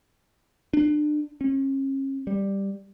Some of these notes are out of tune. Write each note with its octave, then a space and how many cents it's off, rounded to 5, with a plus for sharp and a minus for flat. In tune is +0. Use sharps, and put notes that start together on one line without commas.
D4 +30
C#4 -40
G3 +5